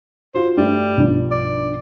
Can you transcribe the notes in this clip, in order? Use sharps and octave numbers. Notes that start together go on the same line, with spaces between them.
F4 F#4 C5
G2 G3 A3
B1 G2 F3
D5